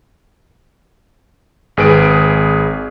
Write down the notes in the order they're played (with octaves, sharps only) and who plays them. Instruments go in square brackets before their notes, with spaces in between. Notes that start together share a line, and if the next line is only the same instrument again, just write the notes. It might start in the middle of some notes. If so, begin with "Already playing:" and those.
[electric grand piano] G#1 G#4 B4 D7